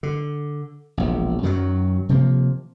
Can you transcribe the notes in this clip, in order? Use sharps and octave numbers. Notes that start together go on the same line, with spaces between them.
D3
E1 A#1
F#2 D#3 E3 F#3
C3 D#3 F3 A#3